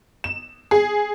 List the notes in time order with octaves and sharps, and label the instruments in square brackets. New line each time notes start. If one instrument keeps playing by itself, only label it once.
[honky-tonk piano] E7
G#4